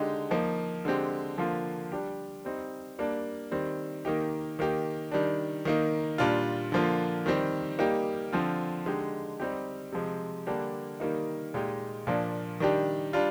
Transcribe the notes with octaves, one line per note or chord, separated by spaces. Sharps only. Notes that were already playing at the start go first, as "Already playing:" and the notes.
Already playing: D3 G#3 D#4 G4
F3 A#3 D#4
D3 G#3 C4 G4
D3 F3 A#3 F4
G3 D4 G4
G3 C4 D#4
G3 A#3 D4
D#3 G3 C4
D#3 A#3 D#4 G4
D#3 A#3 D#4 G4
D#3 G3 D4
D#3 A#3 D#4
A#2 G3 D4 F4
D3 F3 A#3 F4
D#3 G3 C4 G4
G3 A#3 D#4 G4
D3 F3 C4 F4
D3 G#3 D#4 G4
G3 C4 D#4 G4
C3 F3 G#3
D3 G3 A#3 D4 G4
D#3 G3 A#3 D#4
A#2 G#3 D#4 G4
A#2 F3 A#3 D4
D#3 G3 D4 G4
G3 D4 F4